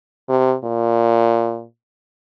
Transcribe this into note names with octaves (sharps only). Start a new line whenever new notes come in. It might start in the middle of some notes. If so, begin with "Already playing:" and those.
C3
A#2